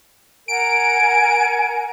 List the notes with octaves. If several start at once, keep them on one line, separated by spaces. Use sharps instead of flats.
A#4 F#5 G#5 D7